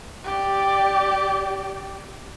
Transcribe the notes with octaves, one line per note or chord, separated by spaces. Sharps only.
G4 D5